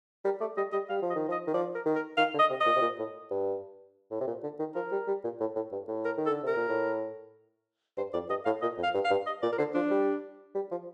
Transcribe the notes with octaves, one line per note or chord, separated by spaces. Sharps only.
G3 A#4
A3 D5
G3 D#5
G3 D#5
G3 F5
F3
D#5
D#3
F3
D#5
D#3
F3 D5
A#4
D#3
A#4
D#3 F5
D3
D#5
C3
A#2 D#5
C3
A#2
A2
G2
A2
C3
A#2
D3
D#3
F3 A#4
G3
G3
A#2
A2
A2
G2
A2
A#4
D#3
A4
D3
C3 A#4
A#2
A2
G2 C5
F2 D5
G2 D#5
A2 F5
A#2 D#5
F2
F5
G2
F5
G2
D#5
A#2 D5
A#4
D3 C5
F3 D4
G3
G3
F3